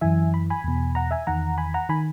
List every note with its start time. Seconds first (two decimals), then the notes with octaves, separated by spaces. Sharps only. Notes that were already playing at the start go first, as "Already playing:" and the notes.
0.01 F#2 E3 E5 G#5
0.34 B5
0.50 G#5 B5
0.64 E2 B2
0.95 F#5 A#5
1.11 E5 G#5
1.27 E2 D#3 F#5 A#5
1.58 G#5 B5
1.74 F#5 A#5
1.89 D#3 G#5 B5